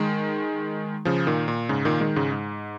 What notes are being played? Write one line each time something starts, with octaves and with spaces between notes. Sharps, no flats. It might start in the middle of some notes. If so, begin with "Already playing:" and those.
Already playing: D#3 G#3
C#3 F3
A#2 D#3
A#2
G#2 C#3
A#2 D#3
D#3 G#3
G#2 C#3
G#2